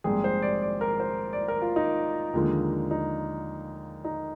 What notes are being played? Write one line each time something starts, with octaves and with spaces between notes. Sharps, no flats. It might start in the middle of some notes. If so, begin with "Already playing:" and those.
A#1 G#2 G3 C4 G#4
C5
D5
D5
A#4
C5
D5
A#4
F4
D#4
D#2 D3 F3 G#3
D#4
D#4